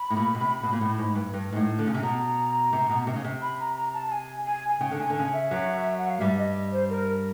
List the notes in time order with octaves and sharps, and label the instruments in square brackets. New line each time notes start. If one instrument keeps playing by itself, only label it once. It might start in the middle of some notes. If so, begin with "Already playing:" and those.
Already playing: [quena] B5
[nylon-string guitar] A2
A#2
B2
C3
B2
A#2
A2
G#2
G2
G2
G#2
A2
D3
C#3
C3
[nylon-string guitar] B2 [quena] A#5
[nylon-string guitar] C3
B2
C3
C#3
C3
[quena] B5
A#5
A#5
A5
A5
G#5
G#5
G#5
[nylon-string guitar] C#3 [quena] G5
[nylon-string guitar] D3
[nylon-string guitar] C#3 [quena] G#5
[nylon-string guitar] D3
[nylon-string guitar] C#3 [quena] G#5
[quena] E5
[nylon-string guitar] F#2 F#3
[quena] F#5
F5
[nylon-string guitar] G2 G3 [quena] E5
[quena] D#5
C5
A#4